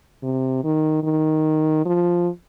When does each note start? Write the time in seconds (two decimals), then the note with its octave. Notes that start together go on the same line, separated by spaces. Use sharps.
0.23 C3
0.64 D#3
1.03 D#3
1.86 F3